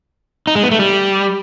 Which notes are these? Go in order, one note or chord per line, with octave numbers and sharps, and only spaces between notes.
D#4
G#3
B3
A3
G3